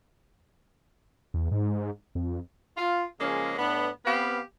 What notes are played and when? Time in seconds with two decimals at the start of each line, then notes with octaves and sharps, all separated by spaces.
1.34 E2
1.51 G#2
2.15 F2
2.77 F4
3.20 C#3 F3 G#3 A#3 C#4
3.57 A2 B3 D4
4.05 B3 C4 G4 B4 F5